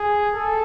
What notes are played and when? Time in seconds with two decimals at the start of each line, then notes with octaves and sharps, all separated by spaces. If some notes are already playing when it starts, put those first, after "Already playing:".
Already playing: G#4
0.34 A4